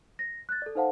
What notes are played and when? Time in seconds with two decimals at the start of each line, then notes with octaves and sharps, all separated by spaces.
0.19 A#6
0.49 F#6 A6
0.62 A4 D5
0.75 D#4 A4 C5 F5 F#5 A5